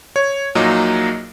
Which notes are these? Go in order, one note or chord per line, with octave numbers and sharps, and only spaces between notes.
C#5
A#1 A#2 F#3 A#3 D#4 D#5